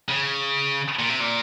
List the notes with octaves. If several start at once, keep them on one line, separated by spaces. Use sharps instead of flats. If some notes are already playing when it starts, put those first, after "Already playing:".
C#3
A#2
C3
A#2